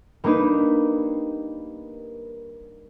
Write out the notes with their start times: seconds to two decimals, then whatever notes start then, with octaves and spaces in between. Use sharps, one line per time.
0.24 G3 A#3 D4 D#4 B4